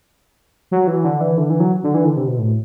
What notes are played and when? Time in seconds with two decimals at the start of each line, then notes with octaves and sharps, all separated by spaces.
0.71 F#3
0.87 E3
1.04 D3
1.21 E3
1.38 D3
1.50 E3
1.60 F#3
1.83 D3
1.95 E3
2.05 D3
2.17 C3
2.27 B2
2.38 A2